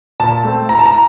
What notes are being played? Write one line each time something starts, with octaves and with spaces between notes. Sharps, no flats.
A#2 A5
A3 C4
A2 A#5
A5
A#5